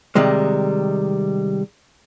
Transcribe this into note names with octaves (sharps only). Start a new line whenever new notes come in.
C3 D#3 G3 G#3